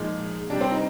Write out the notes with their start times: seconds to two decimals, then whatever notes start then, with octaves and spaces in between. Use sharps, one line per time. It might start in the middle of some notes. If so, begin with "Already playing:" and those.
Already playing: A#2 F3 G#3 D#4
0.50 C3 G3 D4
0.61 C4
0.71 D#4